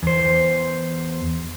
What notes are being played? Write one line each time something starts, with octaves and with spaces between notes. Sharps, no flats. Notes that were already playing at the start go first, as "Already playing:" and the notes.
E2 C5